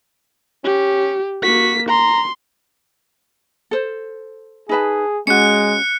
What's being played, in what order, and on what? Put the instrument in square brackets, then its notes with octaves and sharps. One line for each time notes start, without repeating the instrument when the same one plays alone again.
[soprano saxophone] C#4 [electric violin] G4
[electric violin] A#3 B6 [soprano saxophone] F#4
[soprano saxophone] A#5 [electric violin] C6
[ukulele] A4 C5
[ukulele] D#4 B4 A5 [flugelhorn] G#4
[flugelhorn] G#3 [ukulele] C#4 F#4 [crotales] F#6 C#7